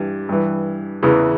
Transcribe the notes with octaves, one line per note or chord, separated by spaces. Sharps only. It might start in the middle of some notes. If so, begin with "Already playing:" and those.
Already playing: G2 E3
G2 E3
E2 C#3 E3